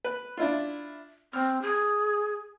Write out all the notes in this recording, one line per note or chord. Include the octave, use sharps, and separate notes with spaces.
B4
D4 E4 F4
C4 F6
G#4